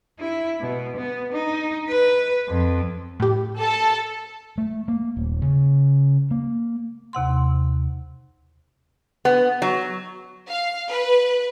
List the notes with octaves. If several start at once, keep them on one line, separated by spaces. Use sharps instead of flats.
E4
B2
B3
D#4
B4
F2
A2 G4
A4 A5
A3
A#3
D#1
C#3
A#3
D#2 C3 F#5 C6
B3
F#3
F5
B4